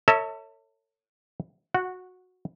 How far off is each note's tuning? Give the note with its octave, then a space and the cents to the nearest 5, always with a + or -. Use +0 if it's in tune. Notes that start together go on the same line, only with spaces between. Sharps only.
A4 +35 C#5 +0 E5 -25
F#4 -15 F#5 +0